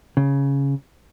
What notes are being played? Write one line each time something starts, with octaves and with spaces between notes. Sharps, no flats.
C#3